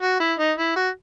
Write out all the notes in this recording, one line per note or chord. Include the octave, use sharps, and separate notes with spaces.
F#4
E4
D#4
E4
F#4